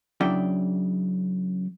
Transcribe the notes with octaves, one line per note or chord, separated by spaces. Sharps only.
C#3 F#3 D4 E4 D5 G5